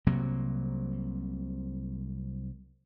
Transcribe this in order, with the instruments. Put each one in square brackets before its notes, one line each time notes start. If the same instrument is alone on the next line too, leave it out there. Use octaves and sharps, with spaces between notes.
[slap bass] C2 C3 F#3 A#3